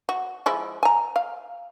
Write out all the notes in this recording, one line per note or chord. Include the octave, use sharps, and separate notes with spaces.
F#4
F3 G#3 E4
G#5 A#5
F5